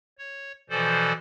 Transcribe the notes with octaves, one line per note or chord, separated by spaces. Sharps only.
C#5
B2 E3 F3 A4 C5 D5